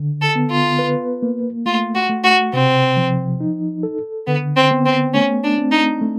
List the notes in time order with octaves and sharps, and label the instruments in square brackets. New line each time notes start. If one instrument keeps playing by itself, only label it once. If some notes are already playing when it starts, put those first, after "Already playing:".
Already playing: [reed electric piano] D3
[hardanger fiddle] A4
[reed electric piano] B3
[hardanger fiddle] F4
[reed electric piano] B4
A#3
[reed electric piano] A3 [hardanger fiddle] F4
[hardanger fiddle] F#4
[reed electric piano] A3
[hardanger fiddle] F#4
[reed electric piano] C3 [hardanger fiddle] C4
[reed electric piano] F3
D#4
A4
[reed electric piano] D3 [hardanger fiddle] B3
[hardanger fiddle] C4
[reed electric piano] B3
[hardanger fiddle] C4
[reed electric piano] A3 [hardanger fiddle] C#4
[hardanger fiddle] D4
[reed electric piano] C4
[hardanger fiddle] D#4
[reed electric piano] A3